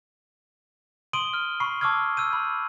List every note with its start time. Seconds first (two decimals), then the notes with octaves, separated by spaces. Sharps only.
1.13 C6 D#6 D7 D#7 F#7 G7
1.33 F6
1.60 B5 C#6 C7
1.81 A5 C#6 D6 E6 F6 G#6
2.17 E6 G6 D#7
2.33 B5